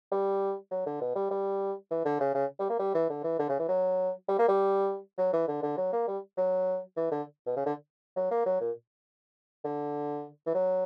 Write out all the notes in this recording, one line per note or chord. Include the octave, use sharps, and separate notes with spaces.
G3
F#3
D3
B2
G3
G3
E3
D3
C#3
C#3
G3
A#3
G3
E3
D3
E3
D3
C#3
E3
F#3
G3
A#3
G3
F#3
E3
D3
D3
F#3
A#3
G3
F#3
E3
D3
B2
C#3
D3
F#3
A#3
F#3
A#2
D3
E3
F#3